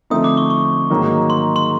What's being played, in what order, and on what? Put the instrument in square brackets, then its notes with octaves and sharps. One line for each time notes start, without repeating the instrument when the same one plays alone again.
[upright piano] D3 F3 A3 C4 D#4 [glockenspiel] D#6
[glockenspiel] D6
C#6
C#6
[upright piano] G#2 D#3 F#3 A#3 D#4
[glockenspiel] C6
C6